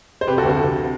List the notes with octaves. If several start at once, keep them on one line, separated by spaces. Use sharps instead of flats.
C5
C3 G4 B4
F#4 A4
D2 G4
F#4 A4
C3